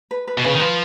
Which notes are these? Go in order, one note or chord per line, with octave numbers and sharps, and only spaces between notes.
B4
B4
B2
C#3 B4
D#3
F3 B4